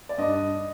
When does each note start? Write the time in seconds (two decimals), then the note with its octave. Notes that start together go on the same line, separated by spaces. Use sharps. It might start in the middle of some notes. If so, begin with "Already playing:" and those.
0.09 D5
0.18 G2 D#5